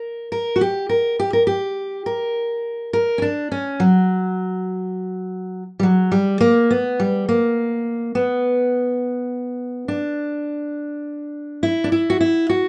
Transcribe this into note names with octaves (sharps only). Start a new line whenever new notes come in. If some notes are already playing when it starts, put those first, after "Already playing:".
Already playing: A#4
A#4
F#4
G4
A#4
G4
A#4
G4
A#4
A#4
C#4
D4
C#4
F#3
G3
F#3
G3
A#3
B3
G3
A#3
B3
D4
E4
D4
E4
F#4
E4
F#4